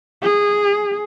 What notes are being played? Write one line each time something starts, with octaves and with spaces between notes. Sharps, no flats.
G#4